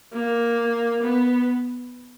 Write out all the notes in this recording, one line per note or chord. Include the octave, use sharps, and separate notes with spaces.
A#3
B3